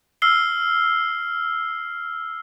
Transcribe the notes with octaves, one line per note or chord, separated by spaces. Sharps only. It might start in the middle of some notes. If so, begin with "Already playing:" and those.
E6 F6 C7 G7